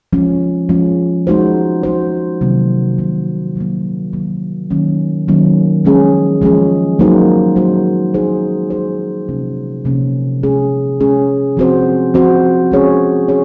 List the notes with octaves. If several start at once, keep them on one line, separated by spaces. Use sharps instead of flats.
F3 G#3 C#4
F3 G#3 C#4
G#3 D#4 F#4 C5
G#3 D#4 F#4 C5
C3 D#3 F#3 A#3
C3 D#3 F#3 A#3
D#3 F#3 A#3
D#3 F#3 A#3
D#3 F#3 A#3 C#4
D#3 F#3 A#3 C#4
F3 G#3 C#4 G#4
F3 G#3 C#4 G#4
F#3 A#3 D#4 F#4 C5
F#3 A#3 D#4 F#4 C5
G#3 D#4 G#4 C5
G#3 D#4 G#4 C5
C3 F3 A#3 C#4
C3 F3 A#3 C#4
G#3 C#4 G#4
G#3 C#4 G#4
F3 C4 F#4 C5
F3 C4 F#4 C5
G#3 C#4 G#4 C#5
C#4 G#4 C#5